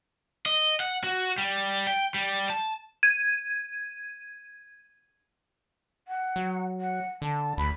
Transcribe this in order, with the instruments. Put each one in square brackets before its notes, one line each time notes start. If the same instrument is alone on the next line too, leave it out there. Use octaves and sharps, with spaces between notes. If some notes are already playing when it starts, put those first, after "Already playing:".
[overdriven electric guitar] D#5
F#5
F#4
G3
G5
G3
A5
[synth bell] G#6 D#7
[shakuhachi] F#5
[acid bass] F#3
[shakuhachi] F#5
[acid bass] D3 [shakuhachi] A5
[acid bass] D2 [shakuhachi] B5